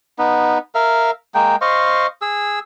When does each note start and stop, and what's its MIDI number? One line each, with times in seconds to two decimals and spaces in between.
0.19 0.58 59
0.19 0.58 63
0.75 1.11 70
0.75 1.11 76
0.75 1.11 77
1.35 1.56 56
1.35 1.56 58
1.35 1.56 79
1.61 2.07 72
1.61 2.07 75
1.61 2.07 77
1.61 2.07 85
2.22 2.59 68
2.22 2.59 88